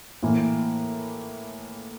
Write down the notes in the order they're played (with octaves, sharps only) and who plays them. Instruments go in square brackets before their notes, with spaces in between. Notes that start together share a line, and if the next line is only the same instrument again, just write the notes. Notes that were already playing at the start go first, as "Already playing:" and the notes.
[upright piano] A2 E3 A#3